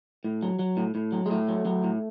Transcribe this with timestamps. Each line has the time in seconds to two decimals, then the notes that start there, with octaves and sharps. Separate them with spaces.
0.24 A2
0.43 F#3
0.59 F#3
0.77 A2
0.95 A2
1.12 F#3
1.26 G#3
1.30 A2 A3
1.49 F#3
1.65 F#3
1.84 A2